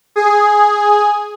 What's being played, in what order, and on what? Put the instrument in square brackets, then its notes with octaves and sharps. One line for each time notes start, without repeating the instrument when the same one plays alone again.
[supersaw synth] G#4